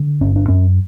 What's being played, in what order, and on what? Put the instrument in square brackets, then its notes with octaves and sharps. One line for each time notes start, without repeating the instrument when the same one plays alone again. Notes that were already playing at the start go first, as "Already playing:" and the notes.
Already playing: [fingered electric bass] D3
G1 C#4
D4
F#2 C#4